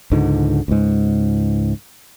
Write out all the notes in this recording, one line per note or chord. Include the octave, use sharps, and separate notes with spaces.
C#2 G#2 D3
C#2 G#2